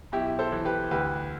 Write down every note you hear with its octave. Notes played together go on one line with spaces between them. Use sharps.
B1 E4 G4
A4 C5
E3
G4 B4
D2 G4 B4